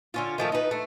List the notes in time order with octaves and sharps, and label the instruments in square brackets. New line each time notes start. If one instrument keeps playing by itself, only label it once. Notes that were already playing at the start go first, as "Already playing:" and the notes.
[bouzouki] D3 C#4 F4
D#3 F3 A3
D#4 B4
A3